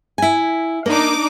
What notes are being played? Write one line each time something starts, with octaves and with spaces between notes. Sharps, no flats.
E4 G#5
A#3 D4 D#4 D6